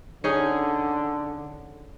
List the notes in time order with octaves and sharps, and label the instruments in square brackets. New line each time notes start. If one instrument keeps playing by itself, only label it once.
[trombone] D3 [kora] C#4 D#4 G#4